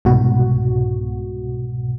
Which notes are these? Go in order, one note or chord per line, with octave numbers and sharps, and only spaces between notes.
C2 G#2 B2 F#4